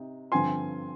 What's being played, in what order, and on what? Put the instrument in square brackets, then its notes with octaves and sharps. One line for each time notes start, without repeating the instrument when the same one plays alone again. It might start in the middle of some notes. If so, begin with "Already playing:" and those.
Already playing: [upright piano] C3 D#4
G2 D3 F3 C4 F4 G#5 C6